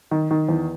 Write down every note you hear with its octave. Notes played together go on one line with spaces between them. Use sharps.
D#3
D#3
E2